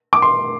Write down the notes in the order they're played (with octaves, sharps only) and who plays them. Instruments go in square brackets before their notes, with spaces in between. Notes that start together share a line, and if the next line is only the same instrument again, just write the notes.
[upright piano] D6
C6